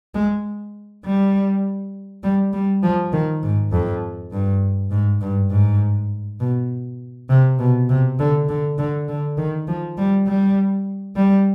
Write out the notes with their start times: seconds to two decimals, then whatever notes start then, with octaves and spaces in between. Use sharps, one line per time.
0.15 G#3
1.05 G3
2.24 G3
2.53 G3
2.83 F3
3.13 D#3
3.43 G#2
3.72 F2
4.32 G2
4.91 G#2
5.21 G2
5.51 G#2
6.40 B2
7.29 C3
7.59 B2
7.89 C3
8.19 D3
8.49 D3
8.78 D3
9.08 D3
9.38 D#3
9.68 F3
9.98 G3
10.27 G3
11.16 G3